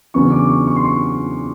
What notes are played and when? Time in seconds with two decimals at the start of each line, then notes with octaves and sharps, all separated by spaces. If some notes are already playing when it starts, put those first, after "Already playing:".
0.14 E2 C#3 F#3 B3 D4 C#6
0.32 D6
0.49 C#6
0.67 C#6
0.76 C6
0.85 C#6